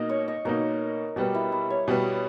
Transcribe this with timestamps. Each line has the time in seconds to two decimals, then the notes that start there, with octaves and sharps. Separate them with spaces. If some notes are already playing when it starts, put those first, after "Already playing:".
Already playing: B2 A#3 D#4 D#5
0.09 C#5
0.28 D#5
0.45 B2 A#3 D#4 A#4
1.16 B2 G3 B3 G4
1.35 E4
1.52 E4
1.70 C#5
1.88 B2 G3 B3